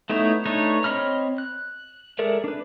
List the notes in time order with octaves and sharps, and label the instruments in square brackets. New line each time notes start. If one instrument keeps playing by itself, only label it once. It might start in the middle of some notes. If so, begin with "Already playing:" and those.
[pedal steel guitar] A3 B3 D#4 E4 C#5
A3 D4 D#4 B4 C#5
C4 C#5 D#5 B5 F6
F#6
G#3 A4 A#4 D5 E5
D4 B4